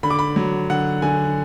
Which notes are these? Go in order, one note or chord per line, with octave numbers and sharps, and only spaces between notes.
D3 B5
D6
B5
F#3
D3 F#5
D3 G#5